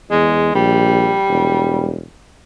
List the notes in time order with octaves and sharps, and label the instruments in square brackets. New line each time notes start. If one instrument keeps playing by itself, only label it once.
[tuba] E2 [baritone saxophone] G#3
[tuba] A#1 [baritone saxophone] G3
[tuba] E1